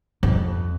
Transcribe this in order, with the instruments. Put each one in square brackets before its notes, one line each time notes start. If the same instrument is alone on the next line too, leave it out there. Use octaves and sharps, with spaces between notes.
[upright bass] F2